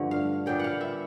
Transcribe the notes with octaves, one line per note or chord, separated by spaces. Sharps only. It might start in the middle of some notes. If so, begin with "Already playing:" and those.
Already playing: G2 D3 F3 A3
F5
A#2 G3 B3 D4 G5
F5 F#5
E5